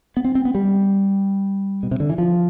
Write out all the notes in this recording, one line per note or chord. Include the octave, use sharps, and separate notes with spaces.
B3
C4
C4
B3
G3
B2
C3
D3
E3
F3